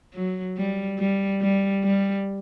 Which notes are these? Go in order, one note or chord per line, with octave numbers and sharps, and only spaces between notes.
F#3
G3
G3
G3
G3